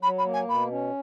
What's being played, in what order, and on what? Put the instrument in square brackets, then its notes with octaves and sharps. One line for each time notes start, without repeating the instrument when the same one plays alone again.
[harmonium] F#3 [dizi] B5
[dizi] B5
[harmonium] A#3
[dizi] G#5
[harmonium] B2 [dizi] B5
[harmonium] C#4